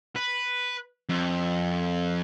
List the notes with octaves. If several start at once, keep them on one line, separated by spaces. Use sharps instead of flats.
B4
F2